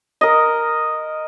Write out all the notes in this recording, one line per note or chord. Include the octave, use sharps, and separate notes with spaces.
A#4 D#5